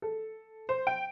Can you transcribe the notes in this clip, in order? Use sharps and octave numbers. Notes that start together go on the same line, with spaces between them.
A4
C5
G5